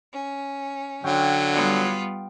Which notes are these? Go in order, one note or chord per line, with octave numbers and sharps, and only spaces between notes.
C#4
D3 F#3 F5 G5 C#6
G3 B3 F4